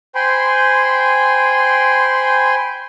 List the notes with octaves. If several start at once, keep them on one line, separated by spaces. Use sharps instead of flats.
C5 G5 G#5 B5 C6